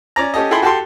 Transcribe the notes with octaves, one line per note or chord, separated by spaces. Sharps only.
C#4 D5 A#5
C#4 G4 A4 D#5
E4 G#4 A4 G5 B5 C6
F#4 G4 A4 G5 C6